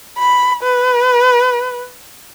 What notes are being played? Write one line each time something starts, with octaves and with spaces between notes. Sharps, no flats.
B5
B4